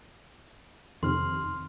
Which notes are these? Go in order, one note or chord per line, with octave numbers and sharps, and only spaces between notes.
F2 C3 D#3 C6 F6